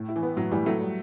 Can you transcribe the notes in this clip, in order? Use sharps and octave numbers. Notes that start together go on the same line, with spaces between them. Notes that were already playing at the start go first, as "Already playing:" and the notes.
Already playing: A2
E4
E3
B3
A2 F#3
A2 E3 G3
F#3 A3 E4
G3